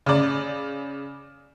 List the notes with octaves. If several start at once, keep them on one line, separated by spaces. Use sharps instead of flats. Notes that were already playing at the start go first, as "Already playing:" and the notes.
C#3 D5